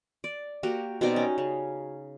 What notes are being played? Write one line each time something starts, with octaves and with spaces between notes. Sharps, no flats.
D5
A#3 F#4 G4
B2 C4 D#4 D5
C#4
C#3